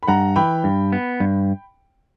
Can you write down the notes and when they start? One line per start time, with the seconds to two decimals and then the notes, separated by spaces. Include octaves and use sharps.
0.03 B5
0.08 G2 F#5 A#5
0.36 E3 G5 B5
0.64 G2
0.93 B3
1.20 G2